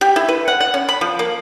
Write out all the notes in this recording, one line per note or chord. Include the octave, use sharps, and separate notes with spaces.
G4
E4
B4
F#5
F#5
C#4
B5
F3
A#3